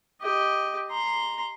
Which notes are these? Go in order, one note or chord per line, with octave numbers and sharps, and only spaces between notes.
G4 D#5
A#5 C6